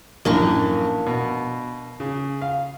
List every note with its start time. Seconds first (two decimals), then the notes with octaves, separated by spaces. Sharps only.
0.25 A#1 F#2 A2 A#3 D4 C#6
1.07 B2
2.00 C#3
2.42 F5